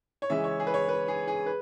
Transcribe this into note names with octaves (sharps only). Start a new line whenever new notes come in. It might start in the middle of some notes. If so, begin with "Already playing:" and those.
C#5
C#3 E3 G#3 C#4 E5
C#5
G#4
B4
C#5
B4
G#4
G#4
B4